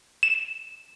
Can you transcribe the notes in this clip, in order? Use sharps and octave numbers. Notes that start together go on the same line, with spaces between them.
E7